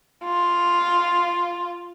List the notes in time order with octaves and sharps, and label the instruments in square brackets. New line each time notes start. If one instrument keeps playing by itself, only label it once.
[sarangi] F4